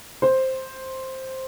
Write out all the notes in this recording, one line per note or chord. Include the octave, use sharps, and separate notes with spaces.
C5